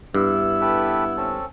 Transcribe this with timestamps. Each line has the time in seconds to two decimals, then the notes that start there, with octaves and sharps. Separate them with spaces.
0.15 G2 B3 E4 E6
0.61 G4 A4 B4
1.17 C4 C#4 A4